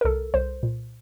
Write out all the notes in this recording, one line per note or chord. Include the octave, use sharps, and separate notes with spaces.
A#4
C2 A4
C2 C5
A#2